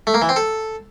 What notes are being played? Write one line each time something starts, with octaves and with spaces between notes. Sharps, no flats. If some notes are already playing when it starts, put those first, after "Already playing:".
A3
A#3
E3
C4
A4